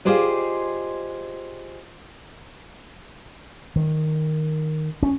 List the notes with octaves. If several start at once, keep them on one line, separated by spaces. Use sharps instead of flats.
F4 G4 G#4 C5 D5 D#5
D#3
C#4